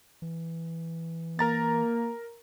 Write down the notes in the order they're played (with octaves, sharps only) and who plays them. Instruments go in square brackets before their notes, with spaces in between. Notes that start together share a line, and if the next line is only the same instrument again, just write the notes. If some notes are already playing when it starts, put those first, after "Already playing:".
[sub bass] E3
[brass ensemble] A#3 [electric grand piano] A#4 A#5 A6